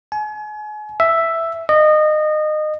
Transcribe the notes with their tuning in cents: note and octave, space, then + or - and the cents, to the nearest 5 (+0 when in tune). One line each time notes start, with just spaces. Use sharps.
G#5 +35
E5 +5
D#5 -25